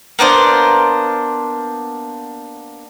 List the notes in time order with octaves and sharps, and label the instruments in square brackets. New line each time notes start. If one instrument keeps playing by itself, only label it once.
[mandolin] A#3 B3 D4 C5